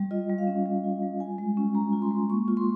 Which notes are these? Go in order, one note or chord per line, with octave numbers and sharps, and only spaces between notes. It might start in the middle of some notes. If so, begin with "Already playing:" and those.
Already playing: G3
F4 D#5
G3
F5
C#4
G3
F4
G3
F4 G#5
G#3
C#4
G#3 A#5
F4
C6
G#3
A#3 C#6
F4
C6